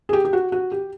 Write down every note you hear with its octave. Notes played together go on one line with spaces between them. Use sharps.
G#4
G4
G4
F#4
F#4
G4